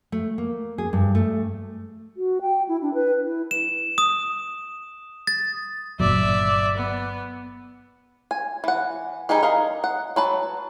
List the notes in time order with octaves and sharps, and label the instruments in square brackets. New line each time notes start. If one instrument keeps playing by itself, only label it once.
[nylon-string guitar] A3
A#3
G#4
G2
A3
[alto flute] F#4
G5
E4
D4
B4
E4
[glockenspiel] E7
D#6
A6
[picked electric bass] G1 A#2 F#3 [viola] D5 E5
[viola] B3
[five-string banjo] G#5
E3 F#5
G3 D#4 G4 G#4 D#5
A#4 D#5 F5
F#5
F#3 B4 A5